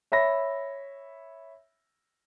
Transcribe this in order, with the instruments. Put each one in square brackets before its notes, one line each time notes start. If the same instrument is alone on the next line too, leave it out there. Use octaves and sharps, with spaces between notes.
[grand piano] C#5 E5 B5 A#6